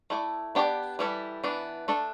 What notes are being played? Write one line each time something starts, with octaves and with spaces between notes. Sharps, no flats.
A3 E4 A4 D5
B3 D4 G4 D5
E3 G3 E4 A4
E3 B3 D4
A3 D4 A4